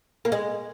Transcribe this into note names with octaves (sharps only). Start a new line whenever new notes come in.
A#3
G#3